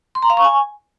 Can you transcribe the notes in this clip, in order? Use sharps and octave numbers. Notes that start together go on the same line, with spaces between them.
C6
A#5
F5
C#6
G#5